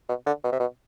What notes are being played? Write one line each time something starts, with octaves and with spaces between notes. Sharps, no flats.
B2
D3
B2
C3
B2